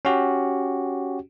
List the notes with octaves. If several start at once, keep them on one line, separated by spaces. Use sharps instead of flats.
C#4 F#4 G4